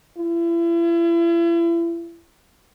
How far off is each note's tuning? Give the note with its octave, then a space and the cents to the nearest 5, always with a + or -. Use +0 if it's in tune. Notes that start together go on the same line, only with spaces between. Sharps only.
E4 +40